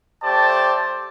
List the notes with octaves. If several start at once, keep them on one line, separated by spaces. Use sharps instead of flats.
A3 G4 C5 D5 A5